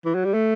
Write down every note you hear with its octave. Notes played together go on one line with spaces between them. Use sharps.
E3
F#3
G3
A3